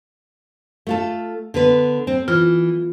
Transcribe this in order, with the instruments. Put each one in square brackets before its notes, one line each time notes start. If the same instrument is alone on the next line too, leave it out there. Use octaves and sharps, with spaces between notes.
[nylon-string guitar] A3 F4 A4
D3 B3 B4
C4
[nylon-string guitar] E3 [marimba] F4